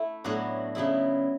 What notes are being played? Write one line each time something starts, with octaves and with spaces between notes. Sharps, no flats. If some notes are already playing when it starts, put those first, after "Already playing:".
Already playing: A3 E4
A2 F#3 B3 D4 F#4
C#3 F#3 B3 E4